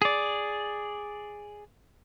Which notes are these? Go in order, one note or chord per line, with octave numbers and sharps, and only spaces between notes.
G#4 D5